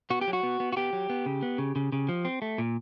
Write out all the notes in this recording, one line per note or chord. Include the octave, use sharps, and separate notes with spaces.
B3 F#4
G4
F#3
F#4
B3
B3
F#4
B3 G4
F#3
B3
C#3
B3
C#3
C#3
C#3
F3
C4
A3
A#2